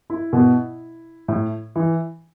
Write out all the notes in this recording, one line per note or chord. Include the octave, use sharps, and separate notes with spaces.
E4
B2
A2
E3